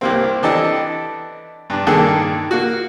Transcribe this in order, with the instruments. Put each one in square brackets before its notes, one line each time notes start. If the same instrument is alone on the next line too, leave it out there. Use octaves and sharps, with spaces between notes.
[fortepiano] C2 A#3 C4
E3 D4 G4 A4 D#5
G2 D4
G2 D#3 A#3 D4 G#4 A4
A#3 F#4